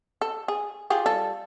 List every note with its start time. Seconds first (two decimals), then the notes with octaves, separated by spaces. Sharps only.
0.21 A4
0.48 G#4
0.90 F4 G4 G#4
1.06 G3 F4 A4